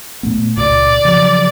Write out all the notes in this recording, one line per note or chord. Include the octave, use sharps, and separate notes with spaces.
A#2 A3 B3
C#2 A#2 D5
C#3 F3 F#3